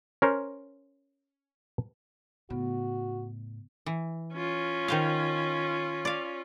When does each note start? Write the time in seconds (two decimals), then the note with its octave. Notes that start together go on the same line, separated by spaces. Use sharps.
0.22 C#4 A#4 C5
2.50 A2 C#3 B3 F#4
3.86 E3
4.34 C#4 F4
4.88 D#3 C5 F5
6.05 D5 F5